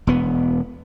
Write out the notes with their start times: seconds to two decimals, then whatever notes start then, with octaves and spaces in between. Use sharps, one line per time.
0.07 E1 B3